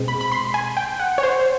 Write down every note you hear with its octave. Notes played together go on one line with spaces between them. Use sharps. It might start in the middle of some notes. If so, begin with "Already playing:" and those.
Already playing: B2 G#3 C4
B5
B5
C6
G#5
G5
F#5
C#5
C5